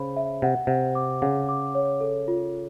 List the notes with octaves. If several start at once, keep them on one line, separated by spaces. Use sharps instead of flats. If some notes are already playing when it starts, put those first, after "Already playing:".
Already playing: C#3 C5 B5
E5
C3 F#5
C3 F#5
D6
C#3 F#5
D6
C#5
A4
F4